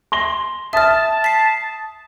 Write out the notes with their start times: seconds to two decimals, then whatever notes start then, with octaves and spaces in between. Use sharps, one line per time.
0.12 C6 A#6 G7
0.73 E5 A5 D#6 F6 A6
1.24 B6 C7